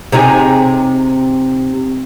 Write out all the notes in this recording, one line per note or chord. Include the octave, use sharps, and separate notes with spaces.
C3 D#4 G#4